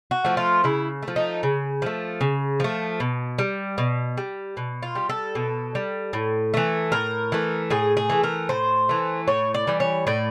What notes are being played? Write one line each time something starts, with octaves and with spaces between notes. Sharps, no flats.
F#4
F3 A3
F4
C#3 E4
A3
F3
D#4
C#3
F3 A3
C#3
F3 A3
B2
G3
B2
G3
B2
F4
G3
A4
B2
G3
A2
E3 A3
A2 A#4
E3 A3
A2 G#4
G#4
E3 A3
A#4
A2 C5
E3 A3
A2 C#5
D5
E3 G3
C#5
A2 D5